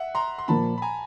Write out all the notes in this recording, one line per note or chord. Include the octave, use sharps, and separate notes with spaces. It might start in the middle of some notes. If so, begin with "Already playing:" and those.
Already playing: E5 F#5
A#5 C6
C6
A#2 F3 A#3 A5 B5
B5
G#5 A#5